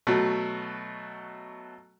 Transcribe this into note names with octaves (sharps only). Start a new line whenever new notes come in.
B2 F#3 A3